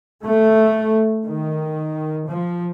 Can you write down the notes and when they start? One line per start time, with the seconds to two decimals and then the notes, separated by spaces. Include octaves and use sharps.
0.23 A3
1.26 D#3
2.29 F3